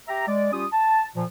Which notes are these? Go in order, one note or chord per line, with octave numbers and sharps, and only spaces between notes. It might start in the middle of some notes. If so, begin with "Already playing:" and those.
G4 E5 G5 A#5
G#3 D5
G3 C#4 F4 G4 D#6
A5
A#2 D3 F3